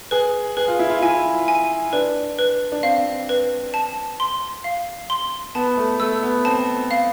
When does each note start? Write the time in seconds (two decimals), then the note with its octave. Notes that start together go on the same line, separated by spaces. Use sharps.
0.11 G#4 B4
0.57 G#4 B4
0.68 F4
0.79 E4
0.90 F4
1.02 E4 G#5
1.48 G#5
1.93 D4 B4
2.39 B4
2.72 D4
2.83 C4 F5
3.29 B4
3.74 A5
4.20 C6
4.64 F5
5.10 C6
5.55 B3 A5
5.77 A3
6.00 A3 E6
6.23 B3
6.45 C4 A5
6.91 F5